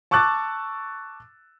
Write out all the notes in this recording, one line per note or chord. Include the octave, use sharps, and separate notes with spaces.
A5 C#6 D6 E6 F#6 A6